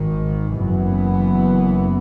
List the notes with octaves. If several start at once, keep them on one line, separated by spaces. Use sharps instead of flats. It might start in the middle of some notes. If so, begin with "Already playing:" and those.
Already playing: G#1 G#2 D#3
F#1 F#2 E3 B3